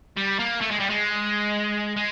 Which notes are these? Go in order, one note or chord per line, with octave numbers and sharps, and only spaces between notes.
G3
A#3
A3
G#3
G3
G#3
G#3